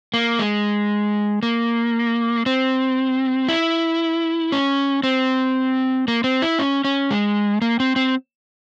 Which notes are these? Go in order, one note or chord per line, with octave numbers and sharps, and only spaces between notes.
A#3
G#3
A#3
C4
E4
C#4
C4
A#3
C4
E4
C#4
C#4
G#3
A#3
C4
C4